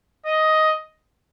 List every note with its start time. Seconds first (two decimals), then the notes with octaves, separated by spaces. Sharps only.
0.26 D#5